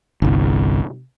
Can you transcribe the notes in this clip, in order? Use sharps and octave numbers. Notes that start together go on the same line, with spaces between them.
G1 C2